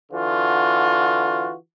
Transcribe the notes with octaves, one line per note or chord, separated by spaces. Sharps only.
D3 E3 F4 F#4